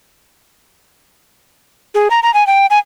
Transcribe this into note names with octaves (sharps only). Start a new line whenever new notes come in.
G#4
A#5
A#5
G#5
G5
G#5